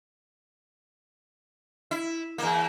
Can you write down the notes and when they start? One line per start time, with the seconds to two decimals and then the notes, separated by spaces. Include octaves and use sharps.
1.91 E4
2.38 E2 A#3